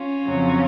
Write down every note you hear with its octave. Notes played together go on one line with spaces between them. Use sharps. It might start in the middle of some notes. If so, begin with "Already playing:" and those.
Already playing: C#4 F4
F2 C#3 F#3